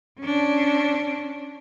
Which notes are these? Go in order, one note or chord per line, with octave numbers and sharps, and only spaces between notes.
C#4 D4